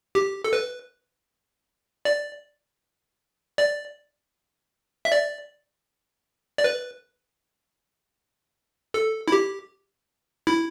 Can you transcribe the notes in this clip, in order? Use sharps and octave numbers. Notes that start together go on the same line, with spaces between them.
G4
A4
B4
D5
D5
E5
D5
D5
B4
A4
E4
G4
E4